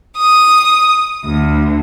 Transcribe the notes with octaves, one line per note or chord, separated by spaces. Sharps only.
D#6
D2